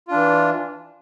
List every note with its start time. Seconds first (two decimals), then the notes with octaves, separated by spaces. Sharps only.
0.08 F4
0.11 D4
0.14 E3